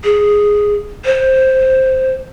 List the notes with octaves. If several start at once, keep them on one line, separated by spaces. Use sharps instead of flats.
G#4
C5